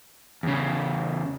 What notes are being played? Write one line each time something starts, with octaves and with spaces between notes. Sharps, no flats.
E2 C#3